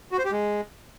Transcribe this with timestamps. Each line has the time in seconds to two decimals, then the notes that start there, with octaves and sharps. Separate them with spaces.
0.12 F#4
0.18 C5
0.25 G4
0.31 G#3